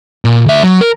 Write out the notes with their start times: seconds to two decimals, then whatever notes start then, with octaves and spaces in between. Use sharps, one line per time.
0.25 A#2
0.46 D2 E5
0.63 F#3
0.81 A#4